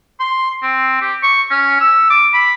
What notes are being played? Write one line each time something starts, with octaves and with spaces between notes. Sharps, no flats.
C6
C4
G4
C#6
C#4
E6
D6
B5